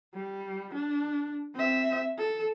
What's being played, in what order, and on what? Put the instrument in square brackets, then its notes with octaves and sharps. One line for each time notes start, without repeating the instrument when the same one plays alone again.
[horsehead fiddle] G3
D4
C4 E5
A4